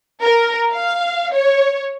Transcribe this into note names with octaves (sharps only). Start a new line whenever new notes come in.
A#4
F5
C#5